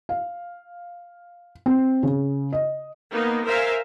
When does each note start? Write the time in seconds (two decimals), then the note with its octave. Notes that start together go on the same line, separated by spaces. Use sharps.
0.09 F5
1.66 C4
2.03 C#3
2.53 D#5
3.11 A#3 B3 D#4
3.45 A#4 C5 E5 F5 G#5